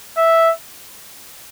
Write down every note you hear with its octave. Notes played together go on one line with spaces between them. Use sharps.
E5